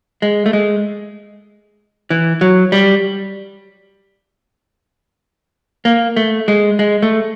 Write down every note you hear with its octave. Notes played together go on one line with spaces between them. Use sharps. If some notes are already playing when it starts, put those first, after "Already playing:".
G#3
A3
G#3
E3
F#3
G3
A#3
A3
G#3
G#3
A3